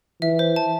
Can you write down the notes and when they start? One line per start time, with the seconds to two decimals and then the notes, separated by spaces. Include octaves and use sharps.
0.21 E3 E5
0.39 C5
0.56 A5